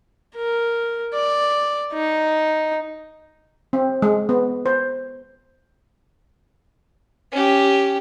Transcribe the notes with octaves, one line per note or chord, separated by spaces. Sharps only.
A#4
D5
D#4
C4
G#3
B3
C5
C#4 G4